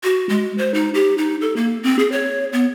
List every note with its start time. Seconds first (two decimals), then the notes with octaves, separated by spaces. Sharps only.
0.04 F#4
0.29 G#3
0.58 C5
0.74 D#4
0.94 G4
1.18 D#4
1.41 A4
1.56 A#3
1.83 C4
1.99 G#4
2.12 C#5
2.53 B3